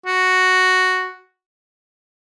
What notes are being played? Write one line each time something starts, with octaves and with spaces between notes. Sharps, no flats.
F#4